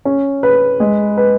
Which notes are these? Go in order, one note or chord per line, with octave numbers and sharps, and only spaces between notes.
C#4
B4
G#3
B4